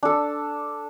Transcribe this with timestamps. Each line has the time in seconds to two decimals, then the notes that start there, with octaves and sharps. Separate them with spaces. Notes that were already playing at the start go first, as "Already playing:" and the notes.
0.03 D4 A4